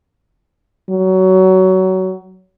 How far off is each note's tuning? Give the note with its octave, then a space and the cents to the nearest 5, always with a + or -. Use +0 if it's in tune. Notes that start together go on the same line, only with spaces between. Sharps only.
F#3 +20